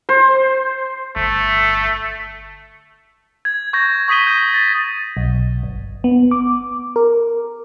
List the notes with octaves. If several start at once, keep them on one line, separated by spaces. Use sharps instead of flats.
C5
G1 A3
G#6
C#6 G6 A#6
C#6 D#6 B6 D#7 G7
G6
A6
B1
G1
B3
D6
A#4